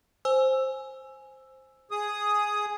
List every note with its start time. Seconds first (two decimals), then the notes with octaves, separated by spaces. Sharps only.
0.25 C5 G#5 E6
1.91 G#4 D#6